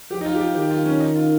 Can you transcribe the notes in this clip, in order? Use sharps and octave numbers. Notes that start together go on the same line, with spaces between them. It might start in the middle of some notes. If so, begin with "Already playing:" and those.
F3 G4
D#4
F4
G4
F4
D#3 G4
F4
C#4
D#4
F4